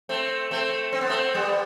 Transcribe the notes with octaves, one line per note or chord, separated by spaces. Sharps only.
A3 C4
A3 C4
C4
B3
A3 C4
G3 B3